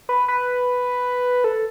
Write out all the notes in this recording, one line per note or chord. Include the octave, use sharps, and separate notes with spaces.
B4
B4
A4